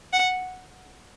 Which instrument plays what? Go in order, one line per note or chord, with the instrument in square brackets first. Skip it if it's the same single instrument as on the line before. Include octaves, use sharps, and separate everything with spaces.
[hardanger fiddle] F#5